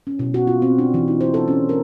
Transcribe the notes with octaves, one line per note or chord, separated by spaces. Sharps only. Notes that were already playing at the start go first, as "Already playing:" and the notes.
C#4
B2
F#4
F4
C4
D4
E3
D#4
C5
A4
C#4
A#4